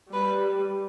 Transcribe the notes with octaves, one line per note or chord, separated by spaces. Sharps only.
G3 B4